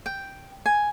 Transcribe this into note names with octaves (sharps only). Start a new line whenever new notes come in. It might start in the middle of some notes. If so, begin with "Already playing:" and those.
G5
G#5